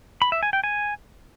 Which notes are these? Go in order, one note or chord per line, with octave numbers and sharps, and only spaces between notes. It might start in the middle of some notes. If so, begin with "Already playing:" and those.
B5
E5
G#5
G5
G#5